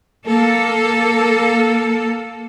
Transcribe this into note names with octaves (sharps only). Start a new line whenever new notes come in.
A#3 A4